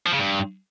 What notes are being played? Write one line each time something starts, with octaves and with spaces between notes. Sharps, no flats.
F3
C#3
G2